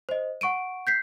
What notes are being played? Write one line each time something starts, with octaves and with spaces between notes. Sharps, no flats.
C5 D#5
F#5 C#6 D7 D#7
G6 B6 C7